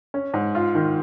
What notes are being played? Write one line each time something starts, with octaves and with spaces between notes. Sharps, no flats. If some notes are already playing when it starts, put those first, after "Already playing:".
C#4
G#2
F4
D#3